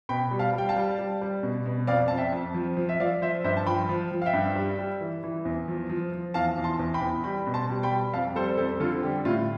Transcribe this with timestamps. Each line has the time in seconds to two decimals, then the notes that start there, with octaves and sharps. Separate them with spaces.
0.09 B2 G5 B5
0.31 G3
0.39 F5 A5
0.54 G3 G5
0.69 F5 A5
0.76 G3
0.98 G3
1.21 G3
1.43 B2
1.66 B2
1.87 F2 D5 F5
2.08 F2 A5
2.17 E5 G5
2.32 F2
2.54 F3
2.77 F3
2.89 E5
3.00 F3 D5 F5
3.22 F3 C5 E5
3.44 G2 C5 E5
3.57 A5
3.66 F3 G5 B5
3.89 F3
4.12 F3
4.22 F5
4.26 E5 G5
4.33 G2
4.56 G3
4.79 G3
5.01 E3
5.24 E3
5.45 E2
5.68 F3
5.89 F3
6.12 F3
6.34 E2 F5 A5
6.58 E2
6.64 A5 C6
6.79 E2
6.94 G5 B5
7.01 E2
7.24 G3 G5 B5
7.46 B2
7.54 A5 C6
7.69 G3
7.83 G5 B5
7.91 G3
8.13 F2 F5 A5
8.36 G3 A4 C5
8.58 F2 A4 C5
8.80 D3 F4 A4
9.03 G3 G4
9.25 A2 F4